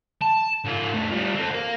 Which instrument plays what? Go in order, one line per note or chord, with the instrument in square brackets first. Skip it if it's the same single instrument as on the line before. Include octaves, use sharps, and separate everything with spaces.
[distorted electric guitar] A5
G#2 F4
E2 A3
G3 F4
C4 A4
A#4 F5